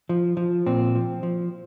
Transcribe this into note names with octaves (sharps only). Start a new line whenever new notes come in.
F3
F3
A#2 C4
F3
F3